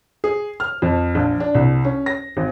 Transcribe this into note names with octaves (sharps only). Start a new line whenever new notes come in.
G#4
F6
F2
A#1
D4
C2
C#4
A#6
G#1